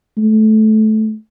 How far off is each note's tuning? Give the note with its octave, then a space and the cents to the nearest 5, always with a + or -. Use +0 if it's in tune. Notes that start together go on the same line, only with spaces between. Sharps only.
A3 -20